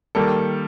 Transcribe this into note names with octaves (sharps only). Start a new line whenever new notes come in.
D#3 G3 A#3 A4